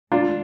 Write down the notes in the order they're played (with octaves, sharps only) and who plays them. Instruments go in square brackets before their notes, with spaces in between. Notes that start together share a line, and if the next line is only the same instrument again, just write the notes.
[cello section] D#3 G#3 [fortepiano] D4 F4